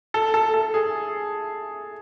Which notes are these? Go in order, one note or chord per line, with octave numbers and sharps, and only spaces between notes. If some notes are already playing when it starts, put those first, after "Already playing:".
A4
A4
A4
G#4